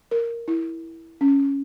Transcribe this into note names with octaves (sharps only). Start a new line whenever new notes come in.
A#4
E4
C#4